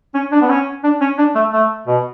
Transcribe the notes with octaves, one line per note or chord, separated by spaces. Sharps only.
C#4
D4
B3
C#4
D4
C#4
D4
A3
A3
B2